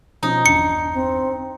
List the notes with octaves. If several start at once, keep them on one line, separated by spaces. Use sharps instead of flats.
B2 F3 C#4 D#4
G1 E2 D4 C#7
C4